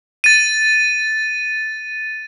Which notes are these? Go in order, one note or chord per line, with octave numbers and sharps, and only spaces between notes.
A6 D#7